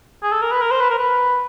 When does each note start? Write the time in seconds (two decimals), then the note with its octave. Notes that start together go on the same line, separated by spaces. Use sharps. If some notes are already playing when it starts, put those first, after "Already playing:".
0.23 G#4
0.32 A4
0.42 A#4
0.51 B4
0.62 A#4
0.71 C5
0.80 B4
0.90 A#4
0.98 B4